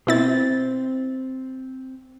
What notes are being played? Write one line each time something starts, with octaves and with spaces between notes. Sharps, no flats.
B2 C4 E4 A6